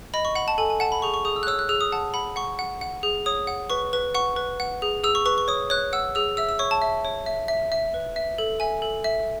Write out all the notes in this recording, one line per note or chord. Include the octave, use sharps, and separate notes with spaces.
D#5 B5
C#6
F#5 B5
A5
A4 G#5
G#5
F#5 A5
B5
G#4 C#6
C#6
G#4 D#6
E6
F#6
C#5 E6
F#6
G#4 E6
D#6
F#5 A5
F#5 B5
F#5 C#6
F#5
F#5
G#4
C#5 D#6
F#5
B4 C#6
B4
F#5 C#6
B4
F#5
G#4
G#4 E6
C#6
B4 C#6
C#6
C#5 D#6
C#5 F#6
F#5 E6
G#4 E6
E5 E6
E6
C#5 C#6
A5
E5
C#5
E5
E5
E5
B4
E5
A4
E5 G#5
A4
E5